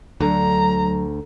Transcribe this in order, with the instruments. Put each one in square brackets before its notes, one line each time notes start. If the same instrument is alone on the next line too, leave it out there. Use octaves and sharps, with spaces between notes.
[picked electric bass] D2 [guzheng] D3 [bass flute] F#3 [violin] A#5